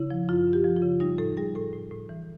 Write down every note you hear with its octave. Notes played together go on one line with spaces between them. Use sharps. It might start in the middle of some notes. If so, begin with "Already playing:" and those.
Already playing: C#3 E4
F3
F#2 F4
F#2
G4
F3
F4
C#3
G3 D#4
A2 A4
G3 G#4
A2 A4
A2
A2
E3